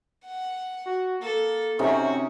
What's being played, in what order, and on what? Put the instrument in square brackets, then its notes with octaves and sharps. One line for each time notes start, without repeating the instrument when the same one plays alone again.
[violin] F#5
[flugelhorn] F#4
[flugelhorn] A#3 [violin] A4
[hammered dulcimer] C3 C#4 D#4 [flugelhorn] C4 [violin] F#4 C#5